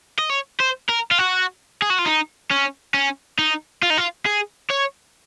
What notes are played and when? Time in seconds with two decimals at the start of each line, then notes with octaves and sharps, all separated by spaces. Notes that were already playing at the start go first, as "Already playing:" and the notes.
0.18 D#5
0.29 C#5
0.60 C5
0.89 A#4
1.11 F4
1.18 F#4
1.82 G#4
1.90 F#4
1.99 F4
2.06 D#4
2.50 C#4
2.94 C#4
3.39 D#4
3.83 F4
3.90 D#4
3.98 F4
4.26 G#4
4.70 C#5